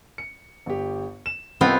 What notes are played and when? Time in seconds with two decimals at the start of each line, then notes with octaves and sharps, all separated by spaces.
0.18 C#7
0.66 G1 G4
1.26 E7
1.61 C2 B3 C4 F4 D#5